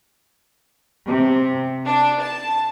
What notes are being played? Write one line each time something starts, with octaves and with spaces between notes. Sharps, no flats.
C3
D4
A5